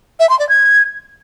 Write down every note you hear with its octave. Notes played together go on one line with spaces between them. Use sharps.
E5
C6
D5
G#6